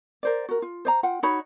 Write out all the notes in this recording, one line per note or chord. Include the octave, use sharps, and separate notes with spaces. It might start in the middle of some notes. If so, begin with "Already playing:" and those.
A#4 C5 D5
F#4 A#4
F4
C5 D5 A#5
F4 F#5 G5
D#4 F#4 C#5 B5